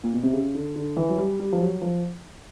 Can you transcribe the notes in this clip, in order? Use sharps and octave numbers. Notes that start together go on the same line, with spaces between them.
A#2
B2
C3
C#3
D3
D3
E3
F#3
G3
G3
F3
F#3
F3